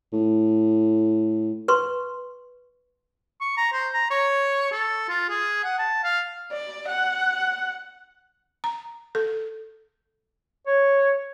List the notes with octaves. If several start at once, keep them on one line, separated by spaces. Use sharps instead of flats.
A2
B4 C6 C#6
C#6
A#5
C5
A#5
C#5
A4
F4
G#4
F#5
A5
F5
D5
F#5
A#5
A4
C#5